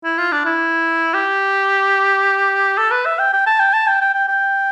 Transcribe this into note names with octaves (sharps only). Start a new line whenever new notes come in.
E4
F4
D4
E4
G4
A4
B4
E5
G5
G5
A5
G5
A5
G5
G5
G5
G5